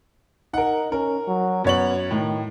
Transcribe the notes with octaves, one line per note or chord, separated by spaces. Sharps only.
D#4 A#4 F#5
C#4 A#4
F#3
F#2 B3 C#5 F#7
A2 D#3